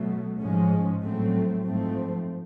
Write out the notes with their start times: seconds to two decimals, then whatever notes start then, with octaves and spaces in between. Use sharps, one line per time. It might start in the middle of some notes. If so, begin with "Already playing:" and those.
Already playing: B2 F#3 A3
0.40 G#2 F3 G#3 C#4
1.03 A2 F#3 A3 C4
1.65 G#2 F3 A3 C4